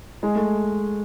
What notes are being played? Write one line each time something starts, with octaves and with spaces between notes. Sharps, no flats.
G#3
A3